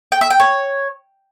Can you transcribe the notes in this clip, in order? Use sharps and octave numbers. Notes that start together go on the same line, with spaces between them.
G5
E5
G5
C#5